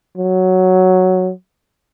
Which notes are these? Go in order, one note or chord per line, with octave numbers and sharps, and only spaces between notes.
F#3